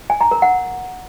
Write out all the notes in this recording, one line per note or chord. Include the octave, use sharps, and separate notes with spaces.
G#5
A#5
A#4
F#5